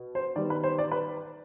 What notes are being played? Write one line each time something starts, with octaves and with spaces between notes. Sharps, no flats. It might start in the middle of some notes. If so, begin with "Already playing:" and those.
Already playing: B2
C5
D#3 G3 B3 D5
B4
C5
D5
B4